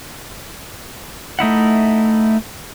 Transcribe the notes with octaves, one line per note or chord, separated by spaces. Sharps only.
A3 D#4 E4 F#5